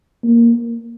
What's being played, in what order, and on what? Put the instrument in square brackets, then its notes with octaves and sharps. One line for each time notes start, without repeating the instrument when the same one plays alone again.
[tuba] A#3